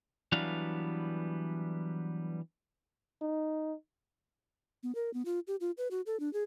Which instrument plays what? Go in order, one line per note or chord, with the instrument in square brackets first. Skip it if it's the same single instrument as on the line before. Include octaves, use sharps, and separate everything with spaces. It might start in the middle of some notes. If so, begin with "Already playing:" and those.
[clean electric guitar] E3 F#3 G3 B3 D4 F5
[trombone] D#4
[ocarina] B3
A#4
B3
F4
G4
F4
B4
F#4
A4
D4
G#4